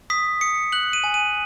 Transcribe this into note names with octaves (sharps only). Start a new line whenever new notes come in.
D#6 B6
D#6 C#7
F#6 F#7
D#7
G#5
D#7